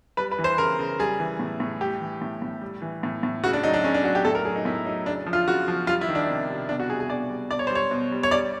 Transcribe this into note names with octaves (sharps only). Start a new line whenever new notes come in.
G3 B4
B4
E3
C5
C#3 A#4
C#3
G3 G#4
E3
A2
A2
G3 G4
E3
A2
A2
G3
E3
A2
A2
C#3 F#4
D4
F#3 D#4
D4
C#3 C#4
D4
F#3 F#4
G4
A2 A4
A#4
F#3 G#4
D#4
A2 E4
F#3 D#4
C#3 D4
F3
F4
C#3 F#4
F3
G3 F4
E4
D#3
D4
C3
C3
B2 D4
F#4
G3 G#4
G#4
B2 D5
G3
B2 D5
C#5
C5
G3
C#5
B2
G3
C#5
G3 D5